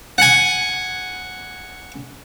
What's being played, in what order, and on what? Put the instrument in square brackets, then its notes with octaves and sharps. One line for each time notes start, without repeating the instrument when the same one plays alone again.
[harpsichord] F#5 G#5